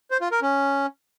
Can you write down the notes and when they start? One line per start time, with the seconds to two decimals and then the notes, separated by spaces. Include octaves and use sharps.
0.11 C5
0.21 F4
0.32 A#4
0.42 C#4